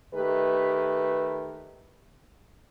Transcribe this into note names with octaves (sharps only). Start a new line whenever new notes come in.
D#3 A3 G4 B4